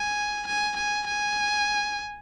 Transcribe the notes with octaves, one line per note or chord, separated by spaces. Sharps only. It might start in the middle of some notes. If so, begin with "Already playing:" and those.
Already playing: G#5
G#5
G#5
G#5